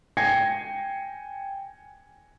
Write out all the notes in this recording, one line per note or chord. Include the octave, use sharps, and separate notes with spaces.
G5 G#5 G#6 A#6 C7 C#7